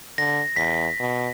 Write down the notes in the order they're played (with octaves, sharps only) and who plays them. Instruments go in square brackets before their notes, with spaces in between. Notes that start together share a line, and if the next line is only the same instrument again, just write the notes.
[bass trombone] D3 [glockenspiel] A#6
[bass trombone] E2 [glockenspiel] B6
[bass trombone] B2